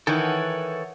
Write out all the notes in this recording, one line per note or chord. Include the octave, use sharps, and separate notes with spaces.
D#3 E3 A4 C#5 F#5